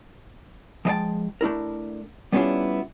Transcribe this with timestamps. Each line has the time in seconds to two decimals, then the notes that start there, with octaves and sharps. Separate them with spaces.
0.85 F3 G#3 D#5 F5 G5 A5
1.41 A3 D4 E4 A#4
2.32 G3 B3 C#4 D4 E4 F4